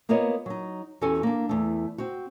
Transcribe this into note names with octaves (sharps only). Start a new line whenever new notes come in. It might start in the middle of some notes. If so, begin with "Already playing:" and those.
A#3 B3 F4 A#4 C#5 D#5
F#3 D#4
E2 C#4 F#4 G4 A4 G#5
A#3 D4
E2 A3
C4 F#4